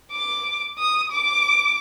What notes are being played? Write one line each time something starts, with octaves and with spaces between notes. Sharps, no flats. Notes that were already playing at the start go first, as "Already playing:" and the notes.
D6
D#6
D6